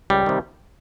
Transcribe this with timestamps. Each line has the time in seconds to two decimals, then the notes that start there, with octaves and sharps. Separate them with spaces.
0.10 C#2 G3
0.26 C3 D#3